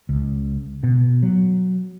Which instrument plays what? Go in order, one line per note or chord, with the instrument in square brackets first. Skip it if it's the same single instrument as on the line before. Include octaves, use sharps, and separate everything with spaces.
[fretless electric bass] C#2
B2
F#3